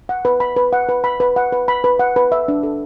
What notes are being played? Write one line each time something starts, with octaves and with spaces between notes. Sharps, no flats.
F#5
B4
B5
B4
F#5
B4
B5
B4
F#5
B4
B5
B4
F#5
B4
E5
D4
A4